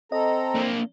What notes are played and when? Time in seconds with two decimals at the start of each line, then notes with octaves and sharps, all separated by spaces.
0.12 C4 A4 D#5 A#5
0.55 A#3 D4